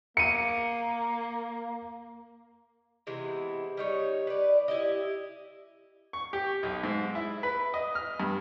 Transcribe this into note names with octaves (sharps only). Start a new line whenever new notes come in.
A#3 C#7 D#7
C3 E3 G#3 B3
G3 D#4 C#5
B4 D5
E4 G4 D#5
C#6
G4
B1
G#2
E4
B4
D#5
F6
G2